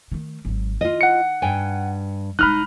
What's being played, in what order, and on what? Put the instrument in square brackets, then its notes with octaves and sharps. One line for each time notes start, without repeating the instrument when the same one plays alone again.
[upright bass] D#3 A3
G#1 F#3
[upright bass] D#3 D#4 [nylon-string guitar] F4 D#5
[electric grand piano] F#5 C#7
[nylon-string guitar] G2 G5 G#5
[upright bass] E1 G#3 [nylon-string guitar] D#4 [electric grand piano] B5 F6 F#6